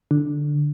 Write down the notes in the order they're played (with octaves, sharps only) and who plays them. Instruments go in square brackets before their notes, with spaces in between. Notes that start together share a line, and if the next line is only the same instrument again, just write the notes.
[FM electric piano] D3